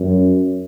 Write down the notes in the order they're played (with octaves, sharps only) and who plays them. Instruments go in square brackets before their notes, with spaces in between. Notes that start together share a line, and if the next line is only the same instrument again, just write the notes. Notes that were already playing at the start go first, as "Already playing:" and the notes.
Already playing: [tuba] F#2